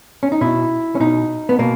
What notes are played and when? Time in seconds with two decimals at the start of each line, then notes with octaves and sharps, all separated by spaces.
0.23 C#4
0.32 D#4
0.41 B2 E4
0.95 C#4
1.00 B2 D#4
1.49 B3
1.59 B2 A#3